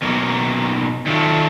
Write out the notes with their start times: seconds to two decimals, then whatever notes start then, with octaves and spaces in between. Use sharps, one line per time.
0.02 B2 F#3 A#3
1.06 D#3 F#3 A3 D4 F4